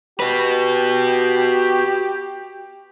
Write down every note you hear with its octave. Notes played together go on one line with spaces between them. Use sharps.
F#4 G4 B4